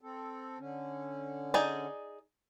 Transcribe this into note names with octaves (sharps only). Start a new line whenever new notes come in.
C4 A4
D3 C#4
D#4 G#4 D5